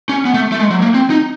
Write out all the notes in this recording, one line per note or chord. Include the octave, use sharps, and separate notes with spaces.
C#4
B3
A3
A3
G#3
F#3
A#3
C4
D#4